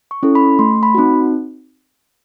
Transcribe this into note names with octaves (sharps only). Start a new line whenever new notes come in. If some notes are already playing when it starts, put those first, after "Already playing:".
C#6
C#4 E4 A4
B5
A3 C6
B5
C4 D#4 F#4